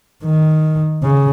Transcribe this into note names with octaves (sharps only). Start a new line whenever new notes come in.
D#3
C#3